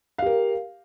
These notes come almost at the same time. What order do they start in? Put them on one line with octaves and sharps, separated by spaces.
F5 G4 A#4